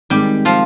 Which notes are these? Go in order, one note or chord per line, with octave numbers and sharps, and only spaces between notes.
D#3 G3 G#3 C4 G4
F3 F4